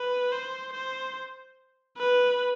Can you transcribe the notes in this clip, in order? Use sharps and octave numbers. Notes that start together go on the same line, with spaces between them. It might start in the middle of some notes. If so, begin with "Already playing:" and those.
Already playing: B4
C5
C5
B4